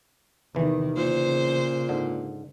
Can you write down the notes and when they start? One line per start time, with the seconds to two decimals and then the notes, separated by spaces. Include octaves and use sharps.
0.55 E2 C3 D#3 E3
0.97 A#2 C#3 C5
1.89 G#2 D3